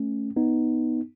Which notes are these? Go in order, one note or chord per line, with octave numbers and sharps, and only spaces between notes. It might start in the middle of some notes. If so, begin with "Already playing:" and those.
Already playing: A3 C#4
B3 D#4